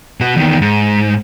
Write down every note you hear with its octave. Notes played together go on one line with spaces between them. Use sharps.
B2 F#4
E2 D#3
G#2